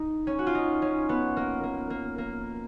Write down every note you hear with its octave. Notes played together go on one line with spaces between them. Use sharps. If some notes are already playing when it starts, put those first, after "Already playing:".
Already playing: D#4
C#4
F#4
F4
D#4
C#4
B3
A#3
A#3
A#3
A#3